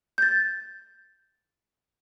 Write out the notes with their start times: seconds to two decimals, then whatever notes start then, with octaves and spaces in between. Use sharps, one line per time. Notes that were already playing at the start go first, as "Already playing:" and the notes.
0.18 G6 A6